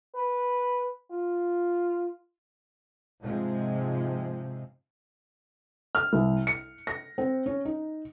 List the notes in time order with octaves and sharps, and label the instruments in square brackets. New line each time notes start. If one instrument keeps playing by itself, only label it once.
[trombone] B4
F4
[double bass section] G#2 C3 F3 G#3
[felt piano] F6
C2
C#7
A#6
C4
C#4
D#4